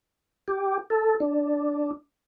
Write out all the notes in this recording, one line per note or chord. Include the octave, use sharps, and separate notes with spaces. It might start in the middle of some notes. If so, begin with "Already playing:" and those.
G4
A4
D4